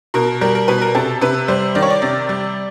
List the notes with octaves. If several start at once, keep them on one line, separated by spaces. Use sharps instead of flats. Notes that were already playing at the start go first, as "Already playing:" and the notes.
B2 A#4
G3 A#4
A#4
B2 B4
A#4
C3 A4
C3 B4
G3 C5
D#3 D5
C#5
D5
C3
G3